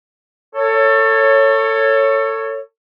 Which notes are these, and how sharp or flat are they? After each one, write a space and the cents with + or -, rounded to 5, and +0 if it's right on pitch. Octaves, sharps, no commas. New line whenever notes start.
A4 +25 C#5 +0